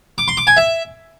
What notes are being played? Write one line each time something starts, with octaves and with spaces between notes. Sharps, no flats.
D6
C6
D6
G#5
E5